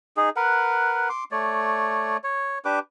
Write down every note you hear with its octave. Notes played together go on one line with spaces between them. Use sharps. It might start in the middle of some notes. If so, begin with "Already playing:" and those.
D#4 G#4
A#4 B4 F#5
C6 D6
A3 C#5 D5
C#5
D4 G4 B4 D6